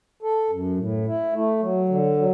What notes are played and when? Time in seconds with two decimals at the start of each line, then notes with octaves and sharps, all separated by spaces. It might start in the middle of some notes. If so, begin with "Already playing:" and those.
0.22 A4
0.50 F#2
0.78 A2
1.06 E4
1.33 A3
1.61 F#3
1.89 D3
2.17 F#3